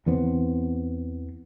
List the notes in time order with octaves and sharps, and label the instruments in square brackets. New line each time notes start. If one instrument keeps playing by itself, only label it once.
[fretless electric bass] E2 E3 B3 C4